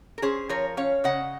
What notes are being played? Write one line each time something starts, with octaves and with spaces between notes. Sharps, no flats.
A#4
C#4 G#4 C5
F3 A#4 C#5
C#4 C#5 F5
C#3 D#5 F#5